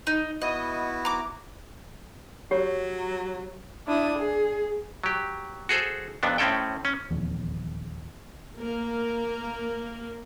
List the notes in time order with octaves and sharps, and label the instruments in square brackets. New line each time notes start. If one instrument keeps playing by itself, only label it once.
[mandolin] D#4
[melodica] B3 E4 F#4 [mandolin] D#5
[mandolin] A#5 D6
[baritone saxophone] F#3 [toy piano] G4 C#5
[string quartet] D4 E4 D#6
G#4
[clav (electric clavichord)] F#3 G4
F#4 G#4 A4 C5
F2 C3 B3 D4
A2 C4 C#4 A4 G5
C#4
[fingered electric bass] D#1 E2 F3 A#3
[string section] A#3 A#4